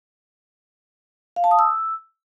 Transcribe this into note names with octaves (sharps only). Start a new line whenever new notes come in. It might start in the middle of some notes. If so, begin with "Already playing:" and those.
F5
A5
D#6
E6